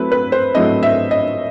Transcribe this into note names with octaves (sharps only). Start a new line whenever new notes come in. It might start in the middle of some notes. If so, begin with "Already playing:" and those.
Already playing: F#3 A3 C4 E4 B4
B4
C5
F#3 A3 C4 E4 D#5
E5
D#5